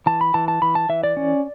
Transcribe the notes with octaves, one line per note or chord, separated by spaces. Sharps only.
E3 A5
B5
E3 A5
A5
E3 B5
A5
E3 E5
D5
C#4